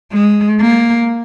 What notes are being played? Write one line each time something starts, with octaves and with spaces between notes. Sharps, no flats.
G#3
A#3